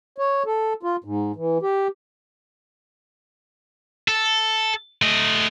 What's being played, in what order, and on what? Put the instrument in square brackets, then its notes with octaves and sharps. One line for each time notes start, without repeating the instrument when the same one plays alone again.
[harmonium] C#5
A4
F4
G#2
E3
G4
[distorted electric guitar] A4
A3 D#5